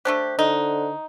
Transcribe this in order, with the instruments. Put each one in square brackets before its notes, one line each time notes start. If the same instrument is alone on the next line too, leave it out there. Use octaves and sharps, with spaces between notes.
[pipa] A3 D4 G4 [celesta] C5 F#6
[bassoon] D3 [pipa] D#4